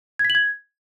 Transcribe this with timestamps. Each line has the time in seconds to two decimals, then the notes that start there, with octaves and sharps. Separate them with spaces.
0.19 G#6
0.25 B6
0.30 F#7
0.35 G#6